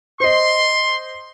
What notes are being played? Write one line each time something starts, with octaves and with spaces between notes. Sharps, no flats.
C5 D#5 C6